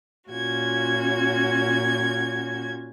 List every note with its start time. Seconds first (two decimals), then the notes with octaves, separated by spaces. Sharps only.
0.31 A#2 C#4 F4 F#4 G#6